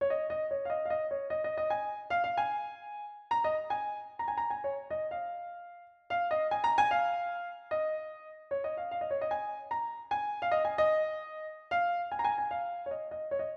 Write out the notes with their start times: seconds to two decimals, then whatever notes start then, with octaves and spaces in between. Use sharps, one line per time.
0.01 C#5
0.10 D#5
0.30 D#5
0.51 C#5
0.65 F5
0.70 D#5
0.85 F5
0.90 D#5
1.11 C#5
1.30 D#5
1.44 D#5
1.57 D#5
1.70 G#5
2.10 F5
2.24 F5
2.37 G#5
3.31 A#5
3.44 D#5
3.70 G#5
4.19 A#5
4.28 G#5
4.37 A#5
4.50 G#5
4.64 C#5
4.90 D#5
5.11 F5
6.10 F5
6.31 D#5
6.51 G#5
6.64 A#5
6.78 G#5
6.91 F5
7.71 D#5
8.51 C#5
8.64 D#5
8.77 F5
8.91 F5
9.01 D#5
9.11 C#5
9.21 D#5
9.31 G#5
9.71 A#5
10.11 G#5
10.42 F5
10.51 D#5
10.65 G#5
10.78 D#5
11.71 F5
12.12 G#5
12.19 A#5
12.24 G#5
12.38 G#5
12.51 F5
12.86 C#5
12.91 D#5
13.11 D#5
13.31 C#5
13.39 D#5